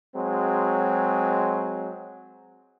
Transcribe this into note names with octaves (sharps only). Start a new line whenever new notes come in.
F#3 G#3 C4